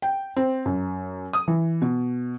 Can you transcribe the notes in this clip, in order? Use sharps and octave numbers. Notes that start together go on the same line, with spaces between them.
G5
C4
F#2
D#6
E3
B2